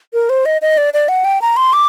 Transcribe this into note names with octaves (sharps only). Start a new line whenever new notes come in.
A#4
C5
D#5
D#5
D5
D5
F#5
G5
A#5
C6
D6